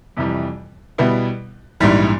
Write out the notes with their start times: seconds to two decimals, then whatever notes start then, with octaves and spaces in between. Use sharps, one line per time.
0.17 F2 C3 E3 G3
0.98 B2 G3 B3 E4
1.80 A#1 G#2 E3 G3